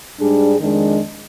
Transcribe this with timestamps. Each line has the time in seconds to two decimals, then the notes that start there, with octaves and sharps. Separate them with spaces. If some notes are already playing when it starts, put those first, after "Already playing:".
0.19 G#2 G3 D4 G#4
0.60 F2 D#3 G#3 D4